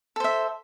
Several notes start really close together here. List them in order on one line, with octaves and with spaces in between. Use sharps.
A4 C5 E5